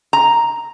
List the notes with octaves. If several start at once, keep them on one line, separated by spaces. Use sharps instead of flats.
A#5